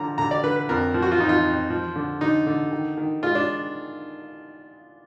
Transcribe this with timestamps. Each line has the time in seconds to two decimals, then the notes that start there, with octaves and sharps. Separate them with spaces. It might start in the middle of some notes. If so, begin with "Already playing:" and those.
Already playing: D3 F3 A#5
0.18 D3 A#5
0.31 D5
0.44 D3 B4
0.56 B4
0.69 F2 A#4
0.94 F3
1.02 F#4
1.11 F4
1.20 F2 D#4
1.29 F4
1.45 F2
1.70 F3
1.95 D3
2.21 D3 D#4
2.47 D3
2.72 D#3
2.98 D#3
3.23 G#3 F4
3.35 D4